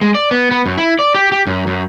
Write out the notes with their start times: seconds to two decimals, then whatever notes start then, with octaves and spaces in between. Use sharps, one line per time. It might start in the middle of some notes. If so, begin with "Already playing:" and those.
0.01 G#3
0.15 D5
0.31 B3
0.51 B3
0.66 F#2
0.78 E4
0.99 D5
1.15 G4
1.32 G4
1.47 F#2
1.67 F#2